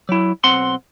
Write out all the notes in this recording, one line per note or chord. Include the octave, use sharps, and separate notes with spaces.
F#3 E4
B1 C4 F#5 C6